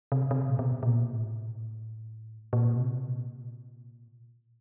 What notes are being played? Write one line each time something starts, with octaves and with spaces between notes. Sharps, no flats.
C3
C3
A#2
B2
B2
A#2
A2
A#2
B2
C3
A#2